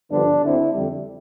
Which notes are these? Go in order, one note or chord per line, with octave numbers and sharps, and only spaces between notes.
G2 D3 F3 B3 D4
D2 D3 A3 C4 E4
F2 D3 G3